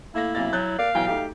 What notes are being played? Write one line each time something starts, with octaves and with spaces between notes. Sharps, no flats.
A3 A#3 E4 A#6
B1 C3 A#3 A6
F#3 F#6 G6 A6
A#3 D5 F5
B1 E3 G5 G#5
A3 D#4 G4